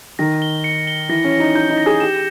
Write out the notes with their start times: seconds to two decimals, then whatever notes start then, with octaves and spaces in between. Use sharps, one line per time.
0.19 D#3 A#6
0.42 G7
0.64 C#7
0.87 G7
1.09 E3 A#6
1.24 C#4
1.32 A#6
1.40 D#4
1.55 D#4 G6
1.70 D#4
1.78 A#6
1.86 G#4
2.00 G4 E7